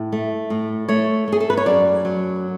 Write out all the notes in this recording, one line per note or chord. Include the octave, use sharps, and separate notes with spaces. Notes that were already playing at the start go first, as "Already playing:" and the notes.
Already playing: A2
A3
A2
A3 C#5
A3 G#4
A4
B4
C#5
F#2 D5
F#3